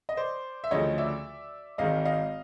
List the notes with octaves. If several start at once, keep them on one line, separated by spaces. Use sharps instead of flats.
D#5
C5 D5
E5
D2 C#3 F3 A3 C#5 D#5
D5 E5
G#1 G#2 D#3 D#5 F5
D#5 F5